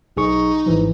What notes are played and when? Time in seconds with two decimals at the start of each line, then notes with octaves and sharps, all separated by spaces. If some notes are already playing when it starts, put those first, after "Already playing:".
0.17 B1 D#4 G#4 C#6
0.66 G#1 E3 F3